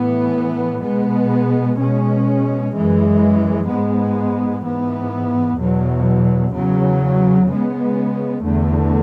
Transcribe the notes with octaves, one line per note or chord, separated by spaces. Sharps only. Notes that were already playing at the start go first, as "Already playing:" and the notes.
Already playing: A2 E3 B3
B2 G#3 B3
B2 G#3 C#4
F#2 E3 G#3
G#2 G#3 B3
G#2 E3 B3
E2 B2 F#3
E2 C#3 F#3
C#3 G#3 B3
E2 D3 A3